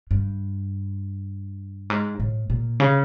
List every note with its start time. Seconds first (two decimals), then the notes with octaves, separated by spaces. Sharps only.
0.11 G2
1.90 G#2
2.20 A2
2.50 A#2
2.80 C#3